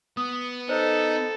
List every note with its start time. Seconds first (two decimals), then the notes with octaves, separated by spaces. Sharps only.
0.17 B3 D#6
0.69 D#4 A4 C5